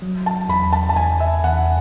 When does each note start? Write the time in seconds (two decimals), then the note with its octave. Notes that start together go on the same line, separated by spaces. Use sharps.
0.02 F#3
0.26 A5
0.49 E2 B5
0.73 A5
0.89 A5
0.96 E2 G#5
1.20 E5
1.44 E2 F#5